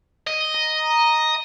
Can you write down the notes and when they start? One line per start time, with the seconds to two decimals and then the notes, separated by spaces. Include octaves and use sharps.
0.27 D#5
0.54 A#5